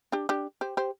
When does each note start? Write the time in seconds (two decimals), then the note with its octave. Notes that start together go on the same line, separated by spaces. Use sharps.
0.12 D4 G4
0.29 D4 G4
0.61 G4 C5
0.77 G4 C5